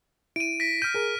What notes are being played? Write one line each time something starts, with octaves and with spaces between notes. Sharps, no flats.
E4 D7 D#7
A#6 B6 D7
F6 G6 D#7
G#4 A#4